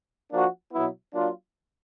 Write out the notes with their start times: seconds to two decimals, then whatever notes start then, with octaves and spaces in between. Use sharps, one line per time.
0.31 F3 A#3 D4 F#4
0.72 B2 F#3 B3 E4
1.14 F#3 A#3 D4 F4